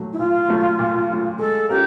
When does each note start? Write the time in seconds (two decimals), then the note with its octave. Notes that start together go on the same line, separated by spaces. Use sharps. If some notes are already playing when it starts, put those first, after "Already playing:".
Already playing: A#2 F#3 A3
0.13 E4
0.19 A#2 F4
0.48 F#3 A3
0.79 A#2
1.10 F#3 A3
1.39 G#3 A4
1.69 C#4 F4 G4 A#4